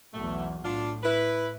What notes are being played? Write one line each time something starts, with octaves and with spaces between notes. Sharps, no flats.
B1 E2 A3
A2 D4 F4
E4 B4